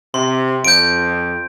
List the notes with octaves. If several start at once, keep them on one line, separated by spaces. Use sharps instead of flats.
C3 C6
F2 G6 D7